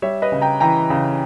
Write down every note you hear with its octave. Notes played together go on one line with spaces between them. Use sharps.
G3 C#5 E5
B4 D#5
C#3
G5 A#5
E3 G5 A#5
C#3